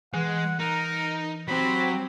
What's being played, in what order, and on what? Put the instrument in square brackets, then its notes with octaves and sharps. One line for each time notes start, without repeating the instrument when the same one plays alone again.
[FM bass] E3 [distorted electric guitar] G#3 [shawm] F#5
[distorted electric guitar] D#4 [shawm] A#4
[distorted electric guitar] F#3 [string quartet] C4 G4 C5 [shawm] B5